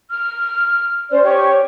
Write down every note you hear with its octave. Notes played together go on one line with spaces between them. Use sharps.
F6
C#4 C5 D5
G4 C#5 C#6